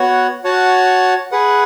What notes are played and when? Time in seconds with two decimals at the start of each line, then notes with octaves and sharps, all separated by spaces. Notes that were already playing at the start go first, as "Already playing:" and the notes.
Already playing: B3 F#4 C#5 F#5
0.44 F#4 C#5 F#5 A5
1.31 G#4 B4 F#5